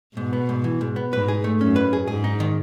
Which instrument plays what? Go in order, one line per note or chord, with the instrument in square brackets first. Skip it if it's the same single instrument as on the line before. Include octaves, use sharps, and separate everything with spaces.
[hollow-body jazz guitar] G#2 [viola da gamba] B2
[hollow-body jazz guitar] B3
G#2
E3
G#2
B3
[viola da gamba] G#2 [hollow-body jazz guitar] B4
[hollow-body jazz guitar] G#4
A3
[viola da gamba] F#2 [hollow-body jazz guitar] C#4
[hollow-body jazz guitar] B4
G#4
[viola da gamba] G#2 [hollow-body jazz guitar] G#4
[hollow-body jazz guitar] D#4
D#3